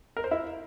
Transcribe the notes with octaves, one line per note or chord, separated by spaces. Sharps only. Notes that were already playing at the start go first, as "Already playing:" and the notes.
A#4
C5
E4